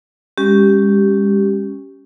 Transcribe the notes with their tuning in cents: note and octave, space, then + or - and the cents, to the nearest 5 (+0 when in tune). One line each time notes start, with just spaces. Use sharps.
G#3 -40 C#4 +0 G4 -10